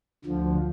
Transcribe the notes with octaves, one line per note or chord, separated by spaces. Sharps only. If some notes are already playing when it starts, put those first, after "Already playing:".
D2 D3 F3